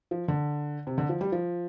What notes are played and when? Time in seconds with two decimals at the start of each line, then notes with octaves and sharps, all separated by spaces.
0.11 F3
0.28 D3
0.87 C3
0.98 D3
1.09 F3
1.21 G3
1.32 F3